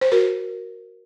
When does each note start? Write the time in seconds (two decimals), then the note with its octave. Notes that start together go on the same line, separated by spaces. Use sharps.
0.01 C5
0.12 F#4 A#4